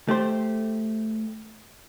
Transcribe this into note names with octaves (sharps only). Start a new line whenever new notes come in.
A3 G4 C5